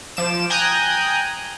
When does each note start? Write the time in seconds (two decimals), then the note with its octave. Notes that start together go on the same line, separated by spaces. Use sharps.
0.17 F3 D6 E7
0.50 G5 G#5 A#5 D#6 F#6 G6